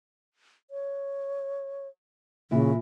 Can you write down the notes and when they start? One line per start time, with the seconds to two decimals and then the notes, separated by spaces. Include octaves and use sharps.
0.71 C#5
2.51 A#2 C#3 E3 E4